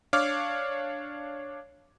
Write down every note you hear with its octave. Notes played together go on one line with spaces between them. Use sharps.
D4 C#5 F5 D6 F6